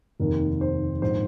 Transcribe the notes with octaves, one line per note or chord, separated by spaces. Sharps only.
F1 D#2 D#3 A#4
C5
A#1 G#2 D#3 C5